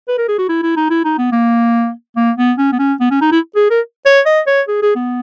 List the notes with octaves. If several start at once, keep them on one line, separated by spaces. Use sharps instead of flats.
B4
A#4
G#4
F#4
E4
E4
D#4
E4
D#4
B3
A#3
A#3
B3
C#4
B3
C#4
B3
C#4
D#4
E4
G#4
A#4
C#5
D#5
C#5
G#4
G#4
B3